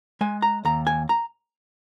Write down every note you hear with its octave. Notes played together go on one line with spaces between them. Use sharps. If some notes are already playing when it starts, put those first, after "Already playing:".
G#3 G#5
A#5
D#2 A#5
G#5
A#5